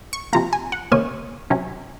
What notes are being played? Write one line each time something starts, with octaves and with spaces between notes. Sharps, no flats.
C#6
C3 F3 A#3 A#5
G#5
F#5
C3 D#3 A#3 C#4 G#5
C3 F#3 C#4